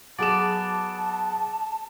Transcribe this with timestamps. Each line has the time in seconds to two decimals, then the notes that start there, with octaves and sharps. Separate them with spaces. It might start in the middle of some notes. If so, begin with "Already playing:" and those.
0.19 F#3 B3 G#4 D5 A5 E7